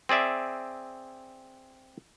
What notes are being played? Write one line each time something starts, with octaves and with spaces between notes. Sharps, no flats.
C4 G#4 D5 E5